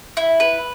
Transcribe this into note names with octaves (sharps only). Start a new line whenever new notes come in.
E4
B4